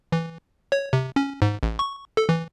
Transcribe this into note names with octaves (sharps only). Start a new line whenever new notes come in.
E3
C#5
C3
C#4
G#2
A1
C#6
A4
E3